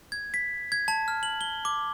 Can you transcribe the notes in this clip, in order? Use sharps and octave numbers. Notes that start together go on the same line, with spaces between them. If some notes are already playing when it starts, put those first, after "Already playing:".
G#6
B6
G#6
A5
F6
F#7
G7
D6